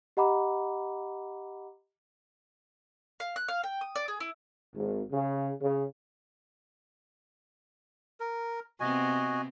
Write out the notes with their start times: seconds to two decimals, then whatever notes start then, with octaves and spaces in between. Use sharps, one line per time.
0.17 G4 D#5 F#5 A#5 B5 D6
3.20 F5
3.36 F#6
3.48 F5
3.64 G5
3.81 D#6
3.96 D5
4.08 G#4
4.20 E4
4.75 G#1
5.12 C#3
5.61 C#3
8.20 A#4
8.80 C3 B3 C4 F#4 D#5 G#5